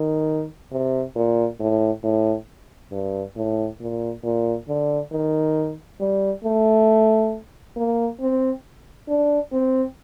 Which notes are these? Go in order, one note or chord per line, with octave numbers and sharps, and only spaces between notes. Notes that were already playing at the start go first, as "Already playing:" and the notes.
Already playing: D#3
C3
A#2
A2
A2
G2
A2
A#2
A#2
D3
D#3
G3
A3
A#3
C4
D4
C4